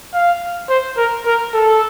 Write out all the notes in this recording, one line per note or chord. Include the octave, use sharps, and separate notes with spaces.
F5
C5
A#4
A#4
A4